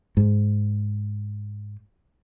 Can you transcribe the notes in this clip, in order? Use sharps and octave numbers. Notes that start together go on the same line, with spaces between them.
G#2